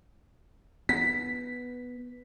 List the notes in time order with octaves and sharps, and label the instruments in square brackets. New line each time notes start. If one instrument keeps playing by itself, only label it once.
[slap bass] B3 [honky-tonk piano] B6